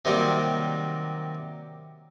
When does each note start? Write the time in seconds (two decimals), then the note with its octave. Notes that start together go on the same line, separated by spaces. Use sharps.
0.05 C3 D#3 F#3 G3 A#3